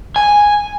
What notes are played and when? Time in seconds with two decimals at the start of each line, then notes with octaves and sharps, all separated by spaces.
0.16 G#5